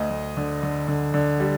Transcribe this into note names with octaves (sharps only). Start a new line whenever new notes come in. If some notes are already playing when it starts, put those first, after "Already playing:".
Already playing: D2 D#5
D2
D3
D3
D3
D3
G3